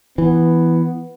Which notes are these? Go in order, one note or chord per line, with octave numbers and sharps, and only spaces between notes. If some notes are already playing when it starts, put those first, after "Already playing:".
E3 B3